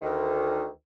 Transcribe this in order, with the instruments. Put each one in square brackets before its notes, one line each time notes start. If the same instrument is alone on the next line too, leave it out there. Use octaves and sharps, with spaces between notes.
[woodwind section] D2 D#3